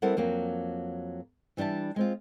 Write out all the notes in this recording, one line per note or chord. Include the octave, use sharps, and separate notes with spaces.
G3 C4 E4 A4 A#4 F#5
F2 F#3 A#3
E3 G3 D4 E5 A5
G#3 C4 F4